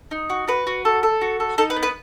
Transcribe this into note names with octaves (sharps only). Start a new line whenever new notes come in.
D#4
F#4
F#4 B4
F#4
A4
A4
F#4
A4
D#4 A4
B4
B3
B4